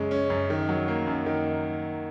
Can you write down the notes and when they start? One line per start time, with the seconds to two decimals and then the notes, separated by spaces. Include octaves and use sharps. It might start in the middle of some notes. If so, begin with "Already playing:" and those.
Already playing: F#2 C#3 G#3 C#4
0.11 C#4
0.30 F#2
0.50 D#3
0.69 F#3
0.88 A#3
1.07 F#2
1.26 D#3